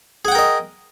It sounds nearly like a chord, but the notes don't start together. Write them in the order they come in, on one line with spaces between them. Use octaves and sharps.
G#4 F#5 G5 A#4 D#5